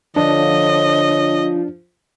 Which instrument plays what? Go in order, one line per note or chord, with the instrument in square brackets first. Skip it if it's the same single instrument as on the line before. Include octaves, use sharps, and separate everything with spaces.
[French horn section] D3 C#5 [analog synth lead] F3 [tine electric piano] D4 [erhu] D#5